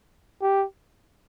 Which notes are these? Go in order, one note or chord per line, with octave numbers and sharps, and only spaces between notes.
G4